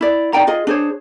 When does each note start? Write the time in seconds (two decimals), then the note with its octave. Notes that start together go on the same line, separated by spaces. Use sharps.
0.01 E4 D5
0.33 D#4 D5 G5 A#5
0.47 F4 G#4 D#5
0.67 D4 G#4 C5 C#5